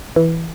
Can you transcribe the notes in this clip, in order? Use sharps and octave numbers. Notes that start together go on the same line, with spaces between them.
E3